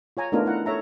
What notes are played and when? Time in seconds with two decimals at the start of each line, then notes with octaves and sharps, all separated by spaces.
0.17 F4 C#5 G#5 A#5
0.32 A3 B3 D4 D#4 F4 A#4
0.46 E4 F#5 A#5
0.66 A4 C#5 E5 A#5